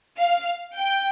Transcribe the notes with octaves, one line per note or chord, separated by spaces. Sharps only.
F5
G5